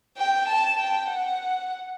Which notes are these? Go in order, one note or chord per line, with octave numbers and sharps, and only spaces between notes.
G5
A5
G5
F#5